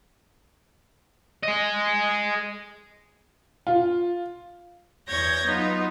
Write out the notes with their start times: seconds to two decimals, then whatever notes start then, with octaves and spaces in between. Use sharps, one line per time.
1.44 G#4 D#5
3.67 F4
5.07 E2 C#5 G6 G#6 A#6
5.45 F#3 B3 D#4 F4